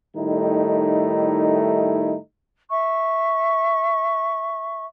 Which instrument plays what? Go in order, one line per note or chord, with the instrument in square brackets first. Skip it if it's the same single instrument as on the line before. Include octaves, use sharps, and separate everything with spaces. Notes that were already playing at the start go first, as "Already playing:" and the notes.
[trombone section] A2 D#3 G3 A3 D#4 E4
[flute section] E5 C#6